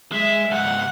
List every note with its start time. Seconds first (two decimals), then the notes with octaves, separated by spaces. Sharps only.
0.12 G#3 E5
0.51 C#2 G#2 F#5